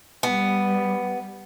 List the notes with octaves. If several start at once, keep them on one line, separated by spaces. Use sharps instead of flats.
G3 B3